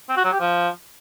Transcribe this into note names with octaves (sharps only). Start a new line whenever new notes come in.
C4
F#4
F#3
G4
F3